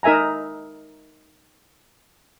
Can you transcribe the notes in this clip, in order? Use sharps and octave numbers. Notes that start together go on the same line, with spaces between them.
D#4 A#4 E5 G#5 A#5